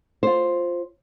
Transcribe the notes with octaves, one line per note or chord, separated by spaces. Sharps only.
F4 C5